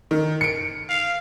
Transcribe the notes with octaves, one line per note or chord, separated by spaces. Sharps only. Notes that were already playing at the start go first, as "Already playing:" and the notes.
D#3
C#7 D7
F5